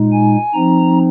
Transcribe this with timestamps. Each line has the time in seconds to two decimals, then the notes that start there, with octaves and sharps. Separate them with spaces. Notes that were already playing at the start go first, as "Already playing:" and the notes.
Already playing: A#2 G#3 D#4
0.12 G#5
0.54 F3 C4 D#4 A#5